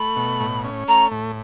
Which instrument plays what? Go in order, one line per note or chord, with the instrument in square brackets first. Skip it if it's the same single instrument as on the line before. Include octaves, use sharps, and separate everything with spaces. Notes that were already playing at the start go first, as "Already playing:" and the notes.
Already playing: [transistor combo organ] A3 [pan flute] B5
[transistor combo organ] B2
A2
C#4
[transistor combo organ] A3 [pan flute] A#5
[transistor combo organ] A2